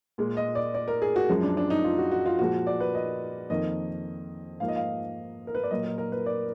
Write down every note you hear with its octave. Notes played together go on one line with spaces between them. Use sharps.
A#2 G#3
D#5
D5
D5
A#4
G#4
F#4
F#2 F3 G#3
D4
D4
D#4
F4
F#4
F#4
F4
A#2 F3 G#3 F#4
D5
B4
D#5
F2 D#3 A#3 D#5
G#2 F3 A#3 F5
D#5
F5
A#4
B4
D5
A#2 F#3 A#3 D#5
A#4
A#4
B4
D5